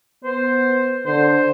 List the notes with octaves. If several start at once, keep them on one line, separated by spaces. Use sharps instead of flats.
B3 C5
D3 C5